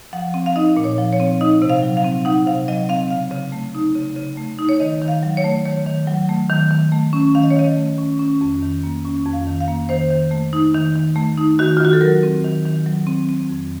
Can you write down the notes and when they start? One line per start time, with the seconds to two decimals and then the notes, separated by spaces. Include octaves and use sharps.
0.13 F3 F#5
0.34 C4
0.46 F5
0.56 D#4 D#5
0.77 A#2
0.84 C#5
0.98 F3
1.13 C#5
1.20 C4
1.41 D#4 D#5
1.62 C3
1.70 F5
1.82 F#3
1.97 F5
2.04 C4
2.25 D#4 F#5
2.46 C3 F5
2.68 F#3 D#5
2.89 C4 F5
3.11 C#3 F5
3.31 C#3
3.52 A3
3.75 D#4
3.95 C#3
4.16 C#3
4.37 A3
4.59 D#4
4.69 C#5
4.80 D#3 D#5
5.02 D#3
5.08 F5
5.23 F#3
5.37 C#5
5.44 A3
5.65 D#3 C#5
5.86 D#3
6.07 F#3
6.29 A3
6.50 D#3
6.71 D#3
6.92 A3
7.13 C#4
7.35 D#3 F5
7.43 D#5
7.51 C#5
7.56 D#3 D#5
7.77 A3
7.98 C#4
8.19 C#4
8.41 F2
8.62 D#3
8.84 A#3
9.05 C#4
9.26 F2
9.33 F5
9.47 D#3
9.61 F5
9.68 A#3
9.89 D#3 C5
10.10 D#3
10.31 A3
10.53 D#4
10.75 D#3
10.95 D#3
11.16 A3
11.37 D#4
11.59 D#3 F#4
11.77 F4
11.80 D#3 F#4
11.93 A4
12.01 F#3 A#4
12.23 C4
12.44 D#3
12.65 D#3
12.86 F#3
13.07 C4
13.29 C4
13.50 F2